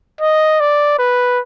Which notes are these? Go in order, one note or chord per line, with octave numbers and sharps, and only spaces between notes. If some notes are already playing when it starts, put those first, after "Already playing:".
D#5
D5
B4